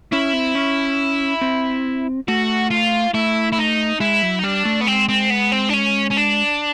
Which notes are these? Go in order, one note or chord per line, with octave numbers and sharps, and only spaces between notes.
C#4 E4
C4
C#4
C4
A3 F#4
F4
A3 E4
E4
D#4
G#3 E4
F#3
D#4
G3 D4
A3
B3
G#3 C4
C4
B3
C4
D4
C#4
C#4
D4